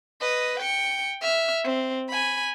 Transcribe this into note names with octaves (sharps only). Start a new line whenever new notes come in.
B4 D#5
G5 C#7
E5 F6
C4
G#5 B5